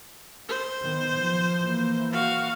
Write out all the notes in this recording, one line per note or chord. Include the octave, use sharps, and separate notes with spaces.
C5
D#3 B3
F3
E3 A#3
F#4 F5